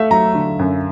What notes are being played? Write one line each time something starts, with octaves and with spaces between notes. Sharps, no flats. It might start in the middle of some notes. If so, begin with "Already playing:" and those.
Already playing: A3 E5 F5
F#3 A#5
D3
F#2